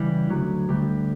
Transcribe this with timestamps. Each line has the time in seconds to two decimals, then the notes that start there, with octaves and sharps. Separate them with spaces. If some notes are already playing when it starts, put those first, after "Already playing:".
Already playing: C#3 E3 G3
0.29 D2 F#3
0.69 D2 G3